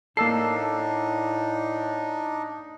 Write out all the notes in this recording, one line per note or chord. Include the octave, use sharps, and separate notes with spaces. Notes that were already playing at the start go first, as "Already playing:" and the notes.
A2 A#3 D4 D#4 A4 E6 C7